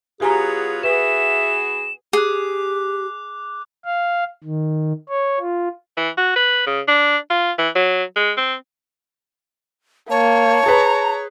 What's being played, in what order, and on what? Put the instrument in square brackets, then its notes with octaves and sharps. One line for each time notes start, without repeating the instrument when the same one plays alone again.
[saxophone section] F#3 B3 F4 [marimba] G4 G#5 A#5 [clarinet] G#4
[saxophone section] B3 F#4 G#4 [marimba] B4 [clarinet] E5 [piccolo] E7
[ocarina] G4 [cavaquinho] G#4 [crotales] D6 F#6
[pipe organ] F5
D#3
C#5
F4
[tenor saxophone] E3
F#4
B4
C#3
D4
F4
E3
F#3
G#3
C4
[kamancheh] A#3 [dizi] C#5 [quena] A5
[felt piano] G#4 B4 [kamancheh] A#5